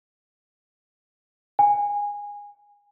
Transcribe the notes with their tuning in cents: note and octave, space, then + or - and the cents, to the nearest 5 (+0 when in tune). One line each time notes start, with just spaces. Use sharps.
G#5 -20